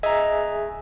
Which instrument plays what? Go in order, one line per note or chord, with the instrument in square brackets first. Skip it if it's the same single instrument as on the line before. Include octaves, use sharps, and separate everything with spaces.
[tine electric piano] G#4 E5 G#5 [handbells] D#5 A#5